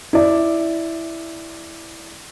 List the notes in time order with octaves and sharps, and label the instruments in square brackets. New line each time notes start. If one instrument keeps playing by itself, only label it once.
[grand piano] E4 D5